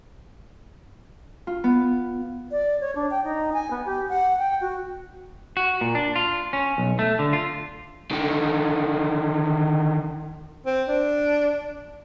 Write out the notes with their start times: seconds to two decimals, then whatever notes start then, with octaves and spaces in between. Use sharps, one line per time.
1.47 F4
1.64 B3
2.50 D5
2.81 C#5
2.95 D4
3.11 G5
3.24 D#4
3.53 G#5
3.70 B3
3.85 G4
4.09 F#5
4.38 G5
4.61 F#4
5.57 F#4
5.81 A#2
5.95 D4
6.16 F4
6.53 C#4
6.78 B1
6.99 A3
7.19 D3
7.33 F4
8.11 D3 D#3
10.66 C4
10.88 D4